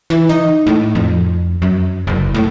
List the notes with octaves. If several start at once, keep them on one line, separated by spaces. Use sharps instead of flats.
E3
D#4
A2
F2
F#2
F#1
A2